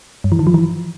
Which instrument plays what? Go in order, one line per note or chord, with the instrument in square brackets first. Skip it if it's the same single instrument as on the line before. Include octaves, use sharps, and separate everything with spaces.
[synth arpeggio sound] G2
E3
D#3
F3
E3